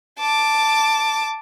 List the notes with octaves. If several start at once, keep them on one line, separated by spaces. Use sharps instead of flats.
A5 D6